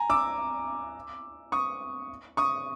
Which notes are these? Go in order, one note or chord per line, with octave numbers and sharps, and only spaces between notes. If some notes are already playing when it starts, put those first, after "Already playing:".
Already playing: G#5 A#5
D6 E6
C#6 D#6
C#6 D#6